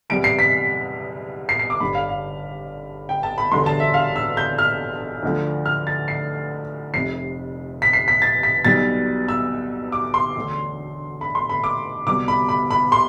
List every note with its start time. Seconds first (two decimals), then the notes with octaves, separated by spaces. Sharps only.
0.10 E2 C3 G3 D7
0.24 C7
0.39 B6
1.49 C7
1.59 C7
1.70 D6
1.80 G1 G2 D3 G3 B5
1.95 F5
2.09 F5
3.09 G5
3.23 A5
3.38 B5
3.52 E1 E2 D3 G3 C6
3.66 A5
3.80 E5
3.94 F5
4.16 E6
4.37 G6
4.58 F6
5.23 D2 D3 F3
5.66 F6
5.87 A6
6.08 C7
6.93 F1 F2 C3 C7
7.82 B6
7.93 C7
8.08 B6
8.22 A6
8.43 B6
8.65 B1 B2 G3 A6
9.28 E6
9.92 D6
10.14 C6
10.36 E1 D2 D3
11.21 B5
11.35 C6
11.49 B5
11.64 D6
12.06 C2 B2 G3 D6
12.28 B5
12.49 B5
12.71 B5
12.92 C6